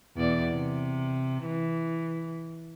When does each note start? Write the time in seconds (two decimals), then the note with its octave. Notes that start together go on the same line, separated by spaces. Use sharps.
0.16 E2 B2 D5
0.51 C3
1.45 E3